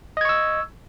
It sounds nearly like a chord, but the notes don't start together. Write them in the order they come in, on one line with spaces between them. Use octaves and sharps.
D#5 G#6 C#6 E6